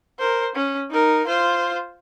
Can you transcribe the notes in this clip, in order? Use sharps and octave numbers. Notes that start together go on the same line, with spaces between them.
A#4 C5
C#4
D#4 A#4
F4 C5